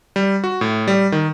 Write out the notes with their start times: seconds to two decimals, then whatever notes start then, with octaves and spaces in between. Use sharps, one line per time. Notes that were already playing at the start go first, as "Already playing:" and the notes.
0.16 G3
0.44 F#4
0.61 A2
0.88 G3
1.12 D#3